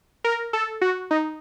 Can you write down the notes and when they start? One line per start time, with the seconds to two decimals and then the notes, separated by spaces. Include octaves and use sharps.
0.24 A#4
0.53 A4
0.81 F#4
1.11 D#4